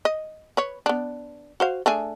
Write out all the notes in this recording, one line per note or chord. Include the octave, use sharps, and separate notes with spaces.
D#5
B4 C#5
B3 D4
F#4 C5 F5
A3 D4 G#4